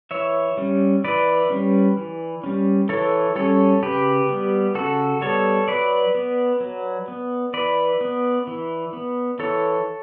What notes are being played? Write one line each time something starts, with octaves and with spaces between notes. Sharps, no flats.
E3 C#5 E5
G3 C#4
E3 B4 D5
G3 C#4
E3
G3 C#4
E3 A4 C#5
G3 C#4 A4 C#5
C#3 G4 B4
G3 B3
C#3 F#4 A4
G3 B3 A4 C#5
F#3 B4 D5
B3
F#3
B3
E3 B4 D5
B3
E3
B3
E3 A4 C#5